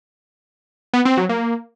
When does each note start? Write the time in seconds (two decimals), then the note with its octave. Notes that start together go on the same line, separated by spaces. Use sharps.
0.93 B3
1.05 C4
1.17 F#3
1.29 A#3